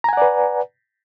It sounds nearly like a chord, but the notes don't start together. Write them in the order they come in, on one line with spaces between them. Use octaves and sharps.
A#5 G#5 F#5 D5 B4